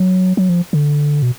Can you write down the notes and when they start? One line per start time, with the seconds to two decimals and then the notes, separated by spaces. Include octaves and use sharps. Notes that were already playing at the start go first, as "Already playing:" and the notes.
Already playing: F#3
0.37 F#3
0.49 F3
0.73 D3
1.22 B2